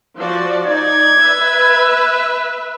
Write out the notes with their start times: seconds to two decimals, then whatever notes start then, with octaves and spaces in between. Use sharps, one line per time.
0.17 F3 F#4 D5
0.66 D#4 D5 G#6
1.20 B4 E5